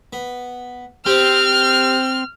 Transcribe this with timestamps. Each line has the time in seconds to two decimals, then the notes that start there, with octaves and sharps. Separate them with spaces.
0.13 B3
1.06 C4 G4 C5 F6